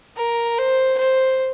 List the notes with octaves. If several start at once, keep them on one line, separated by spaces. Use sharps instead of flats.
A#4
C5
C5